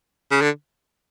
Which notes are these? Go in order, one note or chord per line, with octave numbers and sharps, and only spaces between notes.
C#3
D3